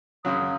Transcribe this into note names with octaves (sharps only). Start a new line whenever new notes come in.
F#2 C#3 F#3 D#6